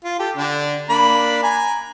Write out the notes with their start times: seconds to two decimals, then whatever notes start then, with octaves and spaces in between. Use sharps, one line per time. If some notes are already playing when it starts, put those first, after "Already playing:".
0.04 F4
0.19 G4 A4
0.37 D3 D4
0.89 A#3 D4 B5
1.43 G#5 A#5